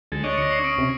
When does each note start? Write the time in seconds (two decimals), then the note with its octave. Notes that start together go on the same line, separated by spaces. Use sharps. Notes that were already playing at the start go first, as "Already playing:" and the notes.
0.12 D2 G#3 A4
0.24 D4 C#5 D#5 G#6
0.38 D2 A#6 C#7
0.51 C#6 C7 F#7
0.64 C#4 D#6 D7
0.78 C3